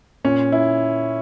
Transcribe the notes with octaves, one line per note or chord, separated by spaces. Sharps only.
A#2 C#4
E4